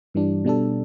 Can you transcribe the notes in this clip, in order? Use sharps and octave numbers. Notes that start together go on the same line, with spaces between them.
G2 E3 G3 D4
B2 G3 D4 A4